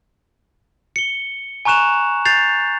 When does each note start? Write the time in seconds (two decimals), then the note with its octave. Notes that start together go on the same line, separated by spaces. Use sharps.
0.96 C#7 G7
1.65 G#5 A#5 C#6 F#6 E7 F7
2.25 G6 A6 C7 F7